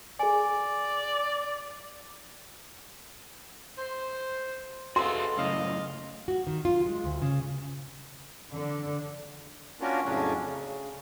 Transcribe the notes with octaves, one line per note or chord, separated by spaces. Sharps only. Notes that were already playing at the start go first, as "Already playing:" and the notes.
G#4 D5 G#5
C5
B3 D#4 F#4 G#4 A4 F5 C6
F#2 A2 C#3 D#5 F5
F#4
D#3
F4
G#3
D2
C#3
D3
A#3 C#4 D4 F4 F#4 A#4
F2 A2 C#3 F#3 C#4 D4
C#3